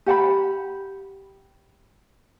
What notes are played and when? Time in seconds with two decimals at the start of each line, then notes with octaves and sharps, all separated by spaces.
0.06 G4 F#5 A5 B5